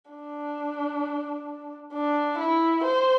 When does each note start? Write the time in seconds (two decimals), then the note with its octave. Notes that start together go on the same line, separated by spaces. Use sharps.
0.11 D4
1.93 D4
2.39 E4
2.84 C5